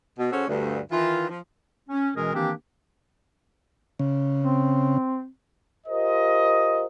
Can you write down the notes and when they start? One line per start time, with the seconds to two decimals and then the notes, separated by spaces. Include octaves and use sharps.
0.19 B2
0.32 C#3 C#4 F#4 A4 C5 C#5
0.48 D2 G2
0.92 D#3 E3 F4
1.29 F3
1.89 C#4
2.15 B2 E3 G#3 C#4 G#4 A#4
2.34 D#3 E3 A#3 C4 D4 G4
3.99 C#3
4.41 C4
5.87 F4 G4 A#4 C5 D#5